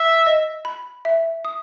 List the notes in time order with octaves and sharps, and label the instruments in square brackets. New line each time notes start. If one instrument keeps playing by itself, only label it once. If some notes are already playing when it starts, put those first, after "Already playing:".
Already playing: [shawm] E5
[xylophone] D#5
B5
E5
D#6